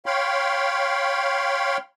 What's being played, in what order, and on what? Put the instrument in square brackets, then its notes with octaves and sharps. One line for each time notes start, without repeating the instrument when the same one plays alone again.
[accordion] C#5 F5 G5 B5 C6